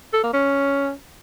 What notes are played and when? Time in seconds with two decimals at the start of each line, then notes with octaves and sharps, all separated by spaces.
0.13 A4
0.23 A#3
0.33 C#4